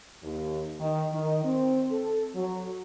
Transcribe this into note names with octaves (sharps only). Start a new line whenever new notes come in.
D#2
D#3
D#3
C4
A4
F#3